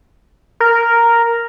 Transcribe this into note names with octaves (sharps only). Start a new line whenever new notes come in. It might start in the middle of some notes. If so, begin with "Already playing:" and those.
A#4